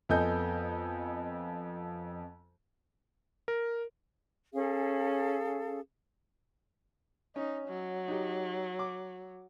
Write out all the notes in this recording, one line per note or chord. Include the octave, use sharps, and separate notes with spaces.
F2 B3 A4 D#5 G#5 G6
A#4
C#4 G#4 A4 F5
C#4 D#4
F#3
D#4 G4
D6